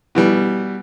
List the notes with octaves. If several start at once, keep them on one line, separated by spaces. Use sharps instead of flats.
B2 E3 G3